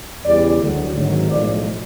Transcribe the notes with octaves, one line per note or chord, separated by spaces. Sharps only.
E2 C#3 E3 G3 D5
D2 D3 F#3
G#1 G#2 D#3 F#3
B1 A2 F3 G#3 D5